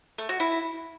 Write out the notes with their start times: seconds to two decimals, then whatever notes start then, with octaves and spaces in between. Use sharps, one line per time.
0.18 A3
0.29 F#4
0.40 E4